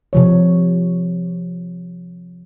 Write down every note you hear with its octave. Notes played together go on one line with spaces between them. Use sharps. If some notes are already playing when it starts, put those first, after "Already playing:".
C3 F3 C#5